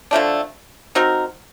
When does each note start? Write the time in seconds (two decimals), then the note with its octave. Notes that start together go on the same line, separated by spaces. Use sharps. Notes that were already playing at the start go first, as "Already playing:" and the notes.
0.11 D3 F3 A3 D4
0.95 C4 D#4 F#4 A#4